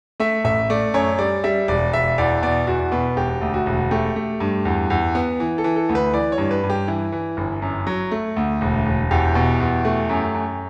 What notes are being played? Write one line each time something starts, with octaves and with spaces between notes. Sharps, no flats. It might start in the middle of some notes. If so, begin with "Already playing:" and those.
A3 E5
A1 E5
A3 D5
F#2 C#5
G3 D5
G3 E5
E1 D5
E1 E5
E2 D5
B2 D5
E2 F#4
B2 B4
E1 G4
D2
F#4
E1
A3 G4
A3
G2
E2
E2
B3
E3
A4
E3
A4
D2
B4
E3 D5
C#5
G2
B4
G2
G4
E3 E4
E3
G1
F#2
F#3
A3
D2
E1
E1
E2 G4
B2
E2
A3
F#2
F#2